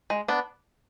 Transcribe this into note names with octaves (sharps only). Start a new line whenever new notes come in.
G#3
B3 D4